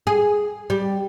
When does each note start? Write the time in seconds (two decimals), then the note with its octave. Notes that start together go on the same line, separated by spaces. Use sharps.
0.07 G#4
0.70 G3